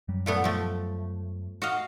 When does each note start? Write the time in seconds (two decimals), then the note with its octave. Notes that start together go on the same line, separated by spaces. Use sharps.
0.08 F#2 F#3 G3
0.26 A#2 A3 B3
0.44 F3 A3
1.62 F#4 D#5 F5